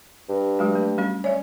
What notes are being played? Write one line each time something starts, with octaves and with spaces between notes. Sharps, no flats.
G2
F#3 G#3 F#4
A3
G3 C#4 F#4
C#4 D5 E5